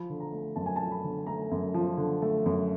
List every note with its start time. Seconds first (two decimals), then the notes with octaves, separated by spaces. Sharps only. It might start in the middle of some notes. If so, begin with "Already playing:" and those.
Already playing: F3 B5
0.10 D3
0.20 A#5
0.32 A3
0.56 F#2 A5
0.66 G#5
0.76 F3 A5
0.91 B5
1.04 D3
1.27 A3 A#5
1.51 F#2
1.74 F3
1.97 D3
2.22 A3
2.46 F#2